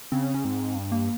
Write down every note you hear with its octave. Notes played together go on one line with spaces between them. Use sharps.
C#3 C4
C#4
G#2 C4
G2
A#3